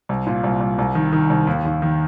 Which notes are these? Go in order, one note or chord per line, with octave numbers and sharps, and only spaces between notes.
C2
A#2
C2
C2
C2
D#3
D#3
C2
D#2
D#2
D#3